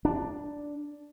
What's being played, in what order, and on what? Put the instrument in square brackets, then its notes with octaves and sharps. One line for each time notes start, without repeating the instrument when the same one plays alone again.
[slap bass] D4